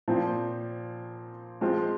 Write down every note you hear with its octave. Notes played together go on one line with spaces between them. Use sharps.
A#2 F3 C4
F3 G#3 C4 F4